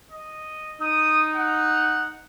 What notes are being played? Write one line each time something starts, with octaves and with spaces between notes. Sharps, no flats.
D#5
D#4 D#6
F#5